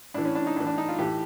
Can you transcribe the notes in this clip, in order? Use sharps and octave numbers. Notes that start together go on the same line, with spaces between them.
A2 E3 D4
C#4
D4
D#4
A2 E3 D4
D4
D#4
F4
A2 E3 G4